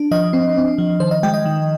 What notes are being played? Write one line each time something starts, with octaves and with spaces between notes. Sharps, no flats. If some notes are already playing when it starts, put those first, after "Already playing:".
Already playing: D4
F3 D#5
C4
C4
F3
D#3 C5
D#5
G#3 G5
D#5
D#3